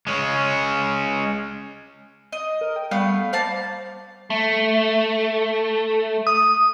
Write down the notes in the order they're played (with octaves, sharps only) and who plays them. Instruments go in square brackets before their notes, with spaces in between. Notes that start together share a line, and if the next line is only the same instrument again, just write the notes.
[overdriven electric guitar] G#3 C#4
[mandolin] D#5
[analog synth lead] A#4
G5
[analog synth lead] G3 [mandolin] A3 B3 F5
[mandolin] A#3 F5 A5 [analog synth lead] C5
[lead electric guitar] A3
[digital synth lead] D#6